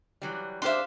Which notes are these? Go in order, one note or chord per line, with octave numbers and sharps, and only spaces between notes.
E3 F#3 G3
D4 G4 C5 E5 F5 C6